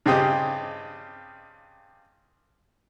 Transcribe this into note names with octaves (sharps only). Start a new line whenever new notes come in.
G2 C#3 C4 G4 D#5